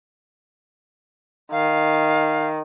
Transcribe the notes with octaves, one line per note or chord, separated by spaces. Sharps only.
D#3 F5